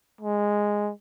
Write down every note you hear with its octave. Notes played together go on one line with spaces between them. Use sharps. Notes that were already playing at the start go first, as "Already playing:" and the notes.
G#3